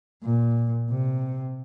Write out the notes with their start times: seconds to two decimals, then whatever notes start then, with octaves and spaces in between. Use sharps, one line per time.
0.23 A#2
0.90 C3